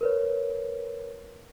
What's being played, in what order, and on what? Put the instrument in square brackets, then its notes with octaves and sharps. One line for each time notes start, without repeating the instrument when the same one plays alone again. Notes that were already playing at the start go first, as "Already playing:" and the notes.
[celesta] A#4 B4 C#5